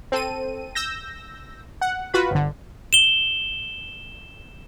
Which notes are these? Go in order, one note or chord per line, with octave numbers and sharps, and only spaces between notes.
C4 A4 D#7
E6 G6 A#6
F#5
F4 F#4 B4 B5
G1 D3
E7 G7